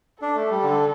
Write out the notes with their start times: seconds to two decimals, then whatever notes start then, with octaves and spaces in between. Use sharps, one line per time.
0.22 D4 A4
0.36 A3
0.51 G3
0.63 D3